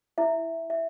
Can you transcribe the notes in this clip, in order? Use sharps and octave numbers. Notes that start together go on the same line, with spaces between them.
E4 E5
E5